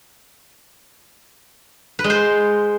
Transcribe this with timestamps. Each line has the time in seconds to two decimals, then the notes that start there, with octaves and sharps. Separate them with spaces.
1.99 B4
2.04 G#3
2.10 C5